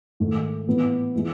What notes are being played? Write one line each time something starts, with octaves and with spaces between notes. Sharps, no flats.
G#2 D#3 A3
A2 E3 B3
E3 G#3